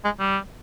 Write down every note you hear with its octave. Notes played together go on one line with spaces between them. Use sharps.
G#3
G3